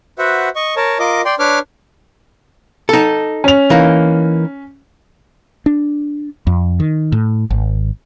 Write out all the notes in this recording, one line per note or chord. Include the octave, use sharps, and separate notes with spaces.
F#4 B4 C5 E5 F#5
D#5 C#6
A#4 C#5 A5
F4 A#4 D#5 D6
D5 G5 C6
D4 B4 C#5 D6 F6
D#4 A4
C#4 F7
E3 A#3 D#4
D4
F2
D#3
A2
G#1